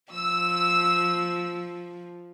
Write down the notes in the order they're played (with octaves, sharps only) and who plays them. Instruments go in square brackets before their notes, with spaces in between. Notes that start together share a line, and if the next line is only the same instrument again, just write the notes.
[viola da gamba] F3 [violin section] E6